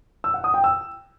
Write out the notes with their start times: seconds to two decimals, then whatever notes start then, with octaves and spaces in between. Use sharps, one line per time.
0.24 E6
0.34 F#5
0.44 D#6
0.54 G5
0.64 E6